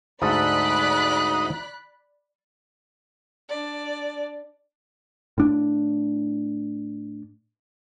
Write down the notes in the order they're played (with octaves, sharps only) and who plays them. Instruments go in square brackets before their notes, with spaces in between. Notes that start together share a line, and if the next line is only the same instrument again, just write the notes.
[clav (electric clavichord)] D2 G#2 A4 [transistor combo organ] D#4 [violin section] D5 B5 F#6
[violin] D4 D5
[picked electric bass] A2 D4